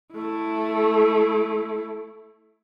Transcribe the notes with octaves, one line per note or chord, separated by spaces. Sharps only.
A3 E4